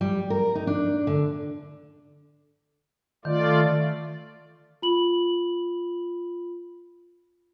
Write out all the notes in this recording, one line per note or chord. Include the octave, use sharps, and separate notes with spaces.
G3
A#4
D#4
D4
D3
D#3 A3 F4 D5
F4 B5 F#7